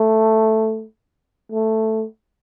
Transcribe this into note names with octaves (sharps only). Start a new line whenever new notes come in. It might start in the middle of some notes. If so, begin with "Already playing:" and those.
Already playing: A3
A3